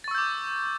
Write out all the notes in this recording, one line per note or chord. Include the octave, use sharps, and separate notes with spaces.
C#6 D6 E6 G6 A6